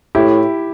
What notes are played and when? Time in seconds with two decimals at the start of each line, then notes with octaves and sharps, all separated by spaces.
0.15 A2 E4 G4